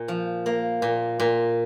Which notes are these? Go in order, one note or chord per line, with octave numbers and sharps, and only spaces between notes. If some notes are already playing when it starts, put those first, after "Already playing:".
Already playing: A#2
F3
A#3
A#2
A#2